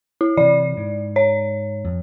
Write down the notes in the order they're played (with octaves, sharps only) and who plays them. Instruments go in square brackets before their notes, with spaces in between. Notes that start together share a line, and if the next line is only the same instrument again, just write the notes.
[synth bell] E4
[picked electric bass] C3 E3 [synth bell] D5
[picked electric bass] G#2
[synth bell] C#5
[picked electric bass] F2